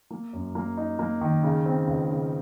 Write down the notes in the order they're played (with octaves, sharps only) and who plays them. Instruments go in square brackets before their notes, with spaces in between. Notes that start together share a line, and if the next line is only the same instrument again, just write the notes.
[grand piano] A#3
F#2
A#3
D#4
A#3
D#3
C#3
C4
C#2
C#3